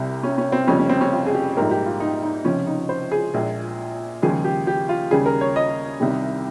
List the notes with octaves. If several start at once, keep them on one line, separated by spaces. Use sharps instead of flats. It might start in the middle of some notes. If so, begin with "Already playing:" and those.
Already playing: C2 C3 G3
C#4
C#4
C4
F1 F2 C#3 G3 C#4
C#4
C4
C#4
F4
G#4
G4
A#1 G#2 G3 A#4
G4
F4
D#4
D#4
C#2 C3 F3 C#4
D#4
C5
G#4
A#1 A#2 G#3
D#2 C#3 F3 G#3 G#4
G4
G4
F4
D#2 C#3 G3 G#4
A#4
C#5
D#5
C2 C3 D#3 G3